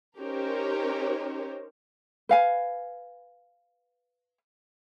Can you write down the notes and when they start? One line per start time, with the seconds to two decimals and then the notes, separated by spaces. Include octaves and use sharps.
0.18 C#4 D#4 G4 A#4 C5 C#5
2.29 B4 F5 G#5